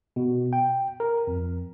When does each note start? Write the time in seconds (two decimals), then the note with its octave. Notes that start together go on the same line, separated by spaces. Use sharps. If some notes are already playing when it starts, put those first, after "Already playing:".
0.16 B2
0.53 G5
1.00 A#4
1.27 F2